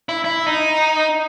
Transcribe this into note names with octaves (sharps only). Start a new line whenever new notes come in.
E4
E4
D#4